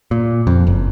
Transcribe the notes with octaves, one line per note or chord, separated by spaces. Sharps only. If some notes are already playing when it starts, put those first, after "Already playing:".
A#2
F2
F#1